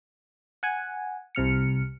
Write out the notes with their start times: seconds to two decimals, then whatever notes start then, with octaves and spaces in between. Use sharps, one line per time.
0.63 F#5 G#5
1.35 C2 C3 F6 C#7